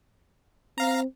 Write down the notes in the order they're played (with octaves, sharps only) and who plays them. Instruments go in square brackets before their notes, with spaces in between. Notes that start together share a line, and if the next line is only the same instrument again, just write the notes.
[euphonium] C4 [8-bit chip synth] F5 A#5